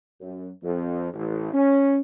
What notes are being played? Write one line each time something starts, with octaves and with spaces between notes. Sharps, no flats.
F#2
F2
A1
C#4